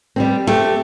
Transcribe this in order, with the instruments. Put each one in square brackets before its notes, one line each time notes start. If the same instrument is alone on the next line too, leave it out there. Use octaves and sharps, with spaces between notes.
[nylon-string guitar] G3 B3 C4
[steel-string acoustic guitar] A3 [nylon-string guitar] C4 G4